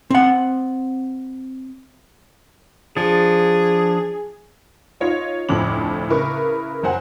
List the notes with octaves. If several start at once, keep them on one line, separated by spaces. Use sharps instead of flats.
C4 F#5
F3 D4 G#4
D#4 F4 C#5 D#5
F1 D2 A2 F3 D6 F#7
C#3 E4 A#4 B4 C#6
F#1 F#3 C5 F#5 G#5